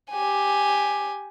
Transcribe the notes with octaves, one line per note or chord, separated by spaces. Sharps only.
G4 G#5